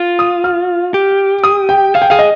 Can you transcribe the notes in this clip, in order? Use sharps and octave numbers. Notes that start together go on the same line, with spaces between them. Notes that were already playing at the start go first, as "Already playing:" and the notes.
Already playing: F4
D#6
F6
G4
D#6
G5
G#4 F5
G5
G#4 F5
D#5